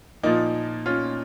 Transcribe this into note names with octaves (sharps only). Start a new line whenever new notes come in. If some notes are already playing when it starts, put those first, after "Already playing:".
A#2 F3 A#3 D#4
C#4 F4